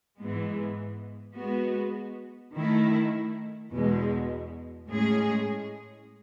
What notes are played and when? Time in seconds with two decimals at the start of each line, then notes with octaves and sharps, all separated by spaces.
0.19 G#2 E3 G#3 B3
1.36 G#3 B3 F#4
2.54 D#3 A3 E4
3.71 E2 B2 G#3
4.88 A2 G#3 C#4 G#4